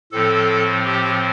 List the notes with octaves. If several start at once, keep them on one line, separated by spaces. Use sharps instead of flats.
A2 F3 C4 A4
G4